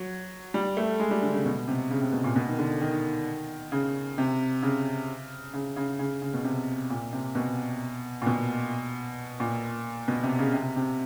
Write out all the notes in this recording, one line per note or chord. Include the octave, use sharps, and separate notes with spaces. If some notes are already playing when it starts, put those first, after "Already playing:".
Already playing: F#3
G3
A3
G#3
G3
D3
C#3
B2
C3
C#3
C3
B2
A#2
B2
D#3
D3
D#3
C#3
C3
C#3
C#3
C#3
C#3
C#3
B2
C3
A#2
C3
B2
A#2
B2
A#2
B2
C3
C#3
C3
C3